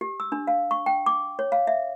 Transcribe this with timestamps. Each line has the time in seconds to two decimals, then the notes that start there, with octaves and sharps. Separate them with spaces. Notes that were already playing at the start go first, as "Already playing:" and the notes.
0.01 G4
0.20 E6
0.32 D4
0.47 F5
0.71 C#6
0.86 G5
1.06 D6
1.39 C#5
1.52 F5
1.67 E5